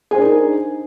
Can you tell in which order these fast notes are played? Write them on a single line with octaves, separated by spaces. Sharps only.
G#4 C5 D4 A#4 D#4